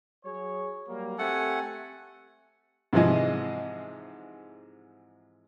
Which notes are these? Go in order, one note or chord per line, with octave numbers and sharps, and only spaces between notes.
F#3 G#4 C#5
F#3 G3 A#3
A3 C4 G4 A4 F#5 G#5
G#2 C3 E3 F3 G#3 D#5